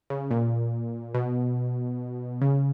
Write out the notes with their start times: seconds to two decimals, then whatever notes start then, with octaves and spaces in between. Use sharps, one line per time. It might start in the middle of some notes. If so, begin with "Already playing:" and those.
0.10 C#3
0.31 A#2
1.14 B2
2.41 C#3